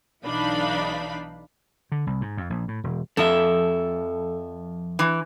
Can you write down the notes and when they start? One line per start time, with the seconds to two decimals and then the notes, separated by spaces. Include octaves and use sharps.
0.24 B1 E3 D4 D#4 F5 B5
1.92 D3
2.07 C2
2.21 G#2
2.37 F2
2.50 A#1
2.68 A2
2.84 E1
3.17 F2 F3 A4 E5
4.99 E3